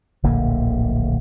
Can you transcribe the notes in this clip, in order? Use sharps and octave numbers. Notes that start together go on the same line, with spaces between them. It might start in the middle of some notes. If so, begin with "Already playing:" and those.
D1 A#1 D3 A#3